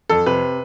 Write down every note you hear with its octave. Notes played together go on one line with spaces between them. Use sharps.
F2 A4
C3 B4